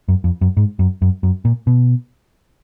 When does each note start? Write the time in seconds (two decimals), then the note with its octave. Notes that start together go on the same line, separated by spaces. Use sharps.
0.08 F#2
0.24 F2
0.41 F#2
0.57 G#2
0.79 F#2
1.02 F#2
1.23 F#2
1.45 A#2
1.67 B2